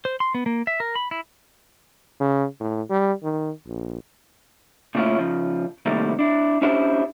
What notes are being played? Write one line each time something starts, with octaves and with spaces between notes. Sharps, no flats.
C5
C6
B3
A#3
E5
A#4
B5
E4
C#3
A2
G3
D#3
A#1
A#2 C#3 A3 C#4 E4 F4
C#3 F3
C3 D#3 G3 A3 A#3 E4
D4 E4
C#4 D4 E4 G4 B4 C5